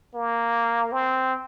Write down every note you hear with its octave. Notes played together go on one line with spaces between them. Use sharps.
A#3
C4